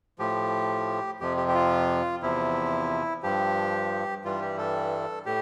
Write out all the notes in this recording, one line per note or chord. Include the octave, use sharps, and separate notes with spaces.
A2 F3 G4
F2 C3 F3 G4
G4
G4
F4
E2 C3 F3 E4
G2 F3 G4
G2 E3 G3 F4
G4
A4
A2 G4